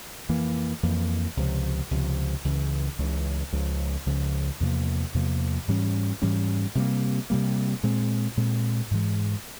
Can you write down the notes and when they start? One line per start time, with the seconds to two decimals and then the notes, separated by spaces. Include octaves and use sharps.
0.29 F2 E3 A#3
0.83 F2 E3 A#3
1.37 C#2 C3 F3
1.91 C#2 C3 F3
2.44 C#2 C#3 E3
2.98 C#2 C#3 E3
3.53 C#2 C#3 F3
4.06 C#2 C#3 F3
4.60 E2 C3 F3 A#3
5.14 E2 C3 F3 A#3
5.68 G#2 E3 G3 C#4
6.22 G#2 E3 G3 C#4
6.75 C3 G3 A#3
7.30 C3 G3 A#3
7.83 A#2 G#3 C4
8.37 A#2 G#3 C4
8.91 G#2 E3 G#3